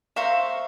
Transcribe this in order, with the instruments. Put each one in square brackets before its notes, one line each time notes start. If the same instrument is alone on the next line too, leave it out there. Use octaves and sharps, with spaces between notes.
[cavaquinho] C5 F5 A#5 C#6 [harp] E5